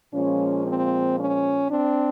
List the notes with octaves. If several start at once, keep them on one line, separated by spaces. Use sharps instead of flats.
A#2 F3 G#3 C#4
C4
C#4
C4 D4